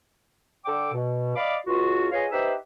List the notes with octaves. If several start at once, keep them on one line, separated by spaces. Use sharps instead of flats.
D3 A4 D5 G5 D6
B2
D5 D#5 F5 B5 D6
C#2 F4 F#4
F4 G#4 B4 C#5 D#5 F5
D#4 G4 B4 C5 E5